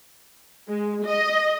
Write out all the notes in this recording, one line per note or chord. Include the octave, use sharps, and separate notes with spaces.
G#3
D#5